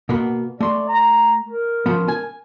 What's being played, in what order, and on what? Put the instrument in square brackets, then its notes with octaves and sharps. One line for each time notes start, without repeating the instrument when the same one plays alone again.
[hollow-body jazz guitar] B2 A#3 B3
[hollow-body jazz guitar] A3 C6 [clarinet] D5
[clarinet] A#5
A#4
[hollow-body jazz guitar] C#3 F3 B3
G#5